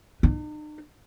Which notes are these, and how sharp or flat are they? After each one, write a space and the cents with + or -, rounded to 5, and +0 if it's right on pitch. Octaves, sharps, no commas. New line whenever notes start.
D#4 -45